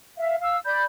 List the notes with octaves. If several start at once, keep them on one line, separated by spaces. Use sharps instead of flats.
E5 F5
F5 E6
D5 B5 G6